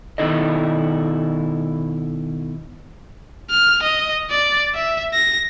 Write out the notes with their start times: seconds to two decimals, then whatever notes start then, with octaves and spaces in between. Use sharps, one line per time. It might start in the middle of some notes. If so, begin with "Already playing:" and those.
0.18 B2 D#3 D#4 E4 A4 D#5
3.50 F6
3.83 D#5
4.30 D5
4.75 E5
5.13 A#6